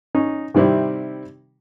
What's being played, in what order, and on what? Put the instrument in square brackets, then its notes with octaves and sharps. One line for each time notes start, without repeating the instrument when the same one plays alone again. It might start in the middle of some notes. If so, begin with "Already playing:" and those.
[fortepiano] C#4 D#4
C3 D#3 G3 C4 E4